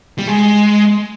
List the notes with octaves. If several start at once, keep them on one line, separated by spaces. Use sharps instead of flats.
G3
G#3